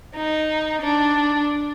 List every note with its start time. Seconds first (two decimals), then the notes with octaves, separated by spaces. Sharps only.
0.16 D#4
0.82 D4